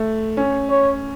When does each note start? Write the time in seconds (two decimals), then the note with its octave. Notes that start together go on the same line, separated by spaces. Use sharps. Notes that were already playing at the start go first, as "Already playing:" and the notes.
Already playing: A3
0.37 C#4
0.70 C#5